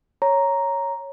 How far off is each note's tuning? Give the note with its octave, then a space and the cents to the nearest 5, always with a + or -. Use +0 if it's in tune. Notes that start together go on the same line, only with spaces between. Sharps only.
C#5 +0 A#5 +0